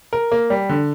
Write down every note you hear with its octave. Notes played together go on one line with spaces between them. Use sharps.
A#4
A#3
G3
D3